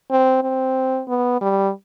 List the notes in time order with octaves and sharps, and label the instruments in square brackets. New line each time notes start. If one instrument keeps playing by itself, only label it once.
[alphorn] C4
C4
B3
G3